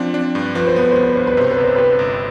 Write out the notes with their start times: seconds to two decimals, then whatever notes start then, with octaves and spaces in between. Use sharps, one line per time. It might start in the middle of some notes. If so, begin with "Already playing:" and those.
Already playing: F3 C4 D4
0.14 D4
0.35 G2
0.55 F3 B4
0.67 C5
0.76 B3 B4
0.92 B3 C5
1.03 B4
1.15 G2 C5
1.27 B4
1.37 C3 C5
1.51 B4
1.58 G1
1.64 C5
1.76 C3 B4
1.99 G1